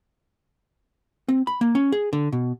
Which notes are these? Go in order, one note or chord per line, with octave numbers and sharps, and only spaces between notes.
C4
B5
A#3
C#4
G#4
D3
B2